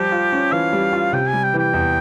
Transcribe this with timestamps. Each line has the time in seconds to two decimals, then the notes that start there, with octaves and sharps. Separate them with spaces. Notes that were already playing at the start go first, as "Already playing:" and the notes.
Already playing: F3 G3 G4
0.12 F4
0.33 C#4
0.52 E3 F5
0.73 G3
0.93 F4
1.13 C3 G5
1.28 G3 G#5
1.44 G5
1.54 E3 G5
1.73 E2